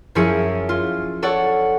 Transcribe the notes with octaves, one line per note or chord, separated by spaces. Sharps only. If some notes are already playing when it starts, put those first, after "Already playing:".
F#2 F3 C#4 E4 G#4 C#7
F4
A4 C#5 D5 F#5